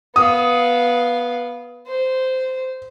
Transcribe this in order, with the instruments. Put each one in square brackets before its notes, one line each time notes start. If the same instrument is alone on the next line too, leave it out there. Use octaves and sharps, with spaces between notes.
[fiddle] B3 F5 [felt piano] D#6
[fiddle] C5